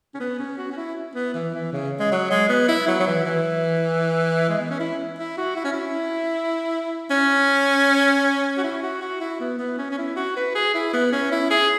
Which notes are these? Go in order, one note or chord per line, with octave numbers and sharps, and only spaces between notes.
C#4
B3
C#4
F#4
C#4
E4
B3
E3
E3
C#3
G#3
F#3
G#3
B3
E4
F#3
F#3
E3
E3
G#3
B3
C#4
E4
E4
F#4
E4
C#4
E4
C#4
F#4
E4
F#4
F#4
E4
B3
B3
C#4
C#4
E4
F#4
B4
G#4
E4
B3
C#4
E4
G#4